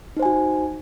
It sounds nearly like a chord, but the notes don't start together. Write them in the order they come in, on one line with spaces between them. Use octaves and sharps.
D#4 C5 G#5 F#4